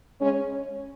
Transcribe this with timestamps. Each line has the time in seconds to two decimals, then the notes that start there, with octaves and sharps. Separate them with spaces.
0.20 C#3 G#3 C#4